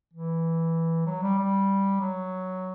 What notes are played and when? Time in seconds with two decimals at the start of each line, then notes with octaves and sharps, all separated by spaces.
0.13 E3
1.06 F#3
1.23 G3
1.38 G3
2.01 F#3